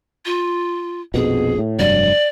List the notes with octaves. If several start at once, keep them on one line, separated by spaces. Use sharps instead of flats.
F4
A#1 F2 B2 G#4
A2
F1 G2 F#3 D5